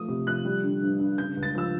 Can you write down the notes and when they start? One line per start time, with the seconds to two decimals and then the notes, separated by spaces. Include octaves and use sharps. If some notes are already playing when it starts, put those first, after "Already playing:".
Already playing: F3 A3 D#6
0.08 C3
0.27 F3 F#6
0.45 G3
0.63 D3
0.82 G2
1.00 G2
1.18 C#3 G6
1.37 C#2
1.43 A6
1.55 F3 E6